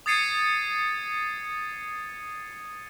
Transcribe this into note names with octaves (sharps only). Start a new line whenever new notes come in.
D#6 G#6 A6 C7 C#7 D#7